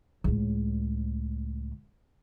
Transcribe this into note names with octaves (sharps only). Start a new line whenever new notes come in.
C#2 A2